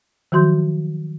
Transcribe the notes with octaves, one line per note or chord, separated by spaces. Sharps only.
D#3 F3 F#3 F#4 C6 G6